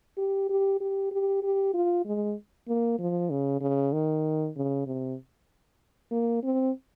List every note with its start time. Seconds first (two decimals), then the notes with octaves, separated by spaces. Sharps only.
0.18 G4
0.50 G4
0.81 G4
1.12 G4
1.43 G4
1.74 F4
2.05 G#3
2.68 A#3
2.99 F3
3.30 C#3
3.61 C#3
3.93 D#3
4.56 C#3
4.86 C3
6.12 A#3
6.44 C4